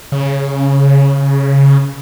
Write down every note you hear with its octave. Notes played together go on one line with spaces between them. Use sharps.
C#3